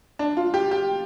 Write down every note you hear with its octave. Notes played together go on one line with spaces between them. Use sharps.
D4
F4
G4
G4